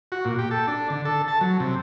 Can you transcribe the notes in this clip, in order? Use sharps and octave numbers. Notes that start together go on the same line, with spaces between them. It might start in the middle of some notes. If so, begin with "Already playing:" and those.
F#4
A#2
G4
A4
D4
D3
A4
A5
F#3
C3